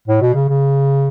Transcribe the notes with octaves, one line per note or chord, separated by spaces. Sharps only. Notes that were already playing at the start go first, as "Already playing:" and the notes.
A2
B2
C#3
C#3